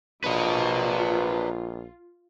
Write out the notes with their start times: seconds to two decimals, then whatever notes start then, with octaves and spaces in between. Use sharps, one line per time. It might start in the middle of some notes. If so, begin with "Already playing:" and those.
0.24 A#1 F#3 D4 F4 B4 D#5